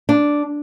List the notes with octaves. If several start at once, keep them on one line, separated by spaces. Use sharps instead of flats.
D4